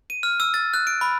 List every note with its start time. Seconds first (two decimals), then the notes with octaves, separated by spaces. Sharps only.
0.10 D#7
0.23 F6
0.40 E6
0.54 A6
0.74 F#6
0.87 D7
1.01 B5